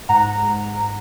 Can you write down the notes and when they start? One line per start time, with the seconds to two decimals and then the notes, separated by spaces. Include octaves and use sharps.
0.09 G#2 F#5 A#5
0.25 G#2
0.42 G#2